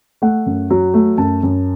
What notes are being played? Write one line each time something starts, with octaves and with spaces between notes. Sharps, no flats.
A3 F#5
F#2
F#3
A3
F#2 A5
F#2